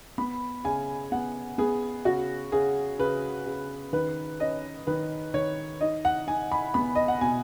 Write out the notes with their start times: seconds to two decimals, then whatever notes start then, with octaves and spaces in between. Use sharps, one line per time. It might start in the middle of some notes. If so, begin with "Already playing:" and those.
0.18 B3 B5
0.65 C#3 G#5
1.12 B3 F#5
1.58 B3 G#4
2.05 C#3 F#4
2.52 C#3 G#4
2.99 C#3 B4
3.46 C#3
3.93 D#3 B4
4.40 C#4 D#5
4.87 D#3 B4
5.34 D#3 C#5
5.81 D#4 D#5
6.05 F#5
6.28 D#4 G#5
6.52 B5
6.74 B3 B5
6.95 D#5
7.08 F#5
7.21 B2 G#5